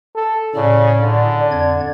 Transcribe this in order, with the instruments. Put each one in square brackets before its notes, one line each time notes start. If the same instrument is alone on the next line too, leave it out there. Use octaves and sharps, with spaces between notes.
[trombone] A4
[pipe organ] A2 [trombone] C#3 [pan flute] D5
[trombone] D3
[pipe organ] F2 D5 G#6